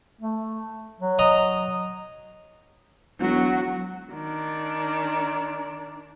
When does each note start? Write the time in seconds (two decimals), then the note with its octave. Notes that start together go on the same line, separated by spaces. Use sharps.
0.21 A3
1.01 F#3
1.19 D#5 A#5
3.20 E1 F#3 F#4
4.14 D#3 D4